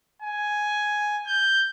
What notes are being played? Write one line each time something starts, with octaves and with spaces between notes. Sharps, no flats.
G#5
G6